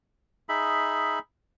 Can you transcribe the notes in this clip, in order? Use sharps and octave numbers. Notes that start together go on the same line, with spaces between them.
D#4 G#4 E5 B5